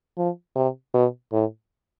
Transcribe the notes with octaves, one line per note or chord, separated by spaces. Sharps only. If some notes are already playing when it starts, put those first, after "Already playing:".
F3
C3
B2
A2